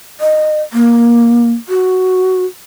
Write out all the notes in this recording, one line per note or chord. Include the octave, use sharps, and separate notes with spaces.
D#5
A#3
F#4